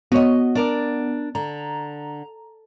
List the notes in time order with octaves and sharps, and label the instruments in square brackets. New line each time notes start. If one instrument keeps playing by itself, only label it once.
[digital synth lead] B3 [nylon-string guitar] F#4 C#5 D#5
[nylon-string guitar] D4 A#4 D5
[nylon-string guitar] D3 [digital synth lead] A#5